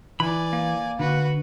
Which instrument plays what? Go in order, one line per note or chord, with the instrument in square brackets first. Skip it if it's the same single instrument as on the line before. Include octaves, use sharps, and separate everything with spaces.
[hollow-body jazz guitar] E3 [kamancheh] D5 G#5 [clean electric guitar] B5
[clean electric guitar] A#3
[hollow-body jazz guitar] D3 [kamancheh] F#4 B4